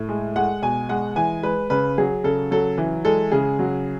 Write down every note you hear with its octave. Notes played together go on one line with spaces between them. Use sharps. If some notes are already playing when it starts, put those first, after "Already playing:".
Already playing: A2
G#3
G#3 F#5
B2 G#5
G#3 F#5
E3 G#5
G#3 B4
C#3 B4
F#3 G#4
C#3 A4
F#3 A4
E3
G#3 A4
C#3 G#4
F#3